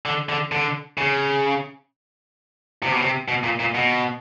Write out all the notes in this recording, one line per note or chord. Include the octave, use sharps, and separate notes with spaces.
D3
D3
D3
C#3
C3
B2
C3
B2
A#2
A#2
B2